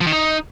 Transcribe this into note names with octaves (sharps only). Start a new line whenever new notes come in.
F3
D#3
D#4